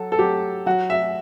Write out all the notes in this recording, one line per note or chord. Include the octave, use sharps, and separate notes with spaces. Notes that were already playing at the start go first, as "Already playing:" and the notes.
Already playing: F#3 A4
A4
F#3 G4
F#3 F#4
E5